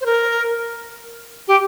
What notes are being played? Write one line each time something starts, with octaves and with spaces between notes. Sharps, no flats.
C5
A#4
G4